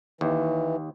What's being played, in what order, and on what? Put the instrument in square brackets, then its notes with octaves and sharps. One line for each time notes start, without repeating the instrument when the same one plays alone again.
[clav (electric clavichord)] D#2 [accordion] E3